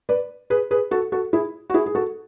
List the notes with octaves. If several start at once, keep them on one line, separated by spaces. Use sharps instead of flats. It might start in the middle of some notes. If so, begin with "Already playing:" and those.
B4 D5
G#4 B4
G#4 B4
F#4 A4
F#4 A4
E4 G#4
F#4
E4 G#4
G#4
F#4 A4